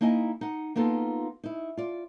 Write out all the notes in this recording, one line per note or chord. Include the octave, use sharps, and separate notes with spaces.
A#3 D#4 E4 D#5 G#5
D#4 F#5
A#3 B3 D#4 F4 A4
D#4 E4
F4 D5